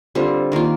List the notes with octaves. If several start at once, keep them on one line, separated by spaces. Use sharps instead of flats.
D3 G3 C4 F4
D#3 A#3 F4